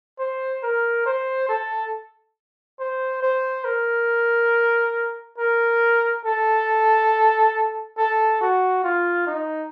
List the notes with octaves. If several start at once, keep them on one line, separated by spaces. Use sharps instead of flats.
C5
A#4
C5
A4
C5
C5
A#4
A#4
A4
A4
F#4
F4
D#4